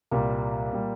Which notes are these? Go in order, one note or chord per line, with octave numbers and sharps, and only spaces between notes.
C2 A#2 G3 A#3
A#2 G3